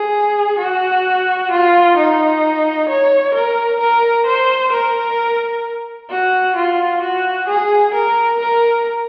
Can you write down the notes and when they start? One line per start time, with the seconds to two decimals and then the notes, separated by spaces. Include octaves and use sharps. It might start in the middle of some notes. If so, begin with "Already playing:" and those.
Already playing: G#4
0.59 F#4
1.51 F4
1.97 D#4
2.89 C#5
3.34 A#4
3.80 A#4
4.27 C5
4.72 A#4
6.10 F#4
6.56 F4
7.02 F#4
7.48 G#4
7.94 A#4
8.40 A#4